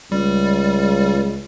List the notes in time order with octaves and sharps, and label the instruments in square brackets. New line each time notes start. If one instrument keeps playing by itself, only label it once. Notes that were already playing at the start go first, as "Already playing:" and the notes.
[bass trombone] C#2 [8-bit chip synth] G3